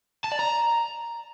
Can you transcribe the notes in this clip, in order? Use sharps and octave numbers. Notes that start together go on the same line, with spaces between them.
A5
D5
A#5